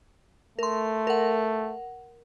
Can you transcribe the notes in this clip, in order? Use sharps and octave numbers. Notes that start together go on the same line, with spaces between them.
A3 A#4 C6
A#4 F#5